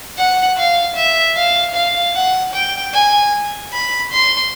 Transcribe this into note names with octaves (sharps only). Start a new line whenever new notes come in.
F#5
F5
E5
F5
F5
F#5
G5
G#5
B5
C6